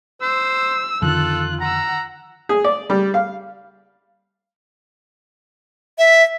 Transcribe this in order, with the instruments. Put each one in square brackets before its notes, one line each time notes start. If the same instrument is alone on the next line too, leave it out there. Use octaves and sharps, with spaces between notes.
[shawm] C5 [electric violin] E6
[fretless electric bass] F2 D3 D#3 [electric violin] F4 F#6 [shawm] A4
[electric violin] F#5 E6 [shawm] A#5
[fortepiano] G#4
D5
G3
F5
[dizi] E5